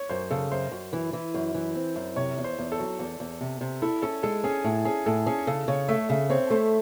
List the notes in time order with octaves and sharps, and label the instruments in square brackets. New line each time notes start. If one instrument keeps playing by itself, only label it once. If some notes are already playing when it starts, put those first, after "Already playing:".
Already playing: [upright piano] C#5
[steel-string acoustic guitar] F#2 [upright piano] C5
[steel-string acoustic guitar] C#3 [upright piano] A4
[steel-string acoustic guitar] F#2 [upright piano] C5
[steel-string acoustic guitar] F#2
E3
E3
F#2
E3
C4
F#2
[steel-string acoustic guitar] C3 [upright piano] C#5
[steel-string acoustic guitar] E2
[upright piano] C5
[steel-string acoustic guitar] E2
[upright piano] A4
[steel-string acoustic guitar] F#3
E2
E2
C3
C3
[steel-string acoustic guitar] E4 [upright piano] A4
[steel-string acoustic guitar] C#4 [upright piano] A4
[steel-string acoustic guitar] G#3 [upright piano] A4
[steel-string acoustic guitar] C#4 [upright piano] G#4
[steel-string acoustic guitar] A2
[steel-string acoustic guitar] C#4 [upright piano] G#4
[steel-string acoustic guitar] A2 [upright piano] A4
[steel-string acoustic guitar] C#4 [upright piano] G#4
[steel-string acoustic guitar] C#3 [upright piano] A4
[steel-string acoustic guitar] C#3 [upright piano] C#5
[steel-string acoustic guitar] A3 [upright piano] E5
[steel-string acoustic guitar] C#3 [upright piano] E5
[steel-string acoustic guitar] C4 [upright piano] C#5
[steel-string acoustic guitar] A3 [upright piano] C5